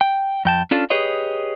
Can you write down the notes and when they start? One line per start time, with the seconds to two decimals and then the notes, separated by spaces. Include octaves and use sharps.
0.01 G5
0.45 F2 G5 A5
0.71 C#4 D4 F4 A4
0.90 G4 G#4 B4 C#5 D#5